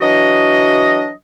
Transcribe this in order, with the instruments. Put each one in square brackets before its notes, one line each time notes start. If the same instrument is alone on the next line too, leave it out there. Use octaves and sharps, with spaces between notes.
[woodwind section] E3 F#3 D4 F#4 D#5